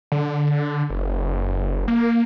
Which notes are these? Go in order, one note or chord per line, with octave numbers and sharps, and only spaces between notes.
D3
F#1
A#3